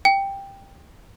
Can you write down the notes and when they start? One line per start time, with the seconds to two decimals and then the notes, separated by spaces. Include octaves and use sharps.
0.05 G5